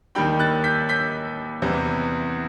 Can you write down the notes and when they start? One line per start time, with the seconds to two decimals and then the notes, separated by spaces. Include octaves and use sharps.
0.15 D#2 D#3 G3 G5 B5
0.39 F#6 A6
0.64 G6 B6
0.89 G6 B6
1.62 E2 C3 E3 G3